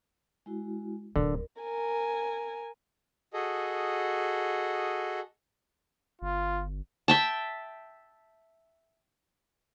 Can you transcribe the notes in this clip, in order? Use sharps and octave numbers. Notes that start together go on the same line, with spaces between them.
G#3 E4 F#4
D1 D3 A#4
A#4 G#5
F#4 G#4 A4 D#5
G1 F4
E5 G5 A5